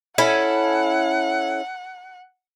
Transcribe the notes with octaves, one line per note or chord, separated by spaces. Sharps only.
C#4 E4 A4 F#5